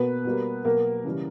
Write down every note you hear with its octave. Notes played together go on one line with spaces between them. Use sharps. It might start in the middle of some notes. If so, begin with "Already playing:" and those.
Already playing: B2 A#3 B3 B4
B2 G3 A#3
B2 F#3 A#3 A#4
C#3 E3 G3